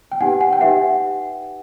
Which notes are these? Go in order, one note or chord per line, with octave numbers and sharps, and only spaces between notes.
G5
D#4 G4 B4 F#5 G#5
F#5 G#5
G5
D#4 G4 B4 E5 F#5